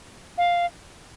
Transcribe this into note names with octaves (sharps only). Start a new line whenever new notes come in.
F5